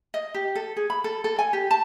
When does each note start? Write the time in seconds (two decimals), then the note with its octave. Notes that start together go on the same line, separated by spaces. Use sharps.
0.14 D#5
0.34 G4
0.55 A4
0.77 G#4
0.90 B5
1.04 A4
1.24 A4
1.39 G#5
1.53 G4
1.71 A5